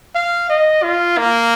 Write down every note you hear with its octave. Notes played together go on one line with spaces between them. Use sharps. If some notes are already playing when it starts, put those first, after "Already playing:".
F5
D#5
F4
A#3